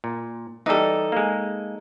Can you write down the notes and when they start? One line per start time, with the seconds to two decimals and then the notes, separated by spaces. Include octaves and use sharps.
0.04 A#2
0.66 E3 G3 D#4 A4
1.12 G#3 A#3